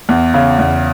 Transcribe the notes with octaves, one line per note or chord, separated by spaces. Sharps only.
E2
C#3
E2